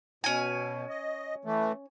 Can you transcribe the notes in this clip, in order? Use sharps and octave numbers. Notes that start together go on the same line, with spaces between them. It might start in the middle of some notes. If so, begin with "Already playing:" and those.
B2 C#4 G#5
D#5
E3 A3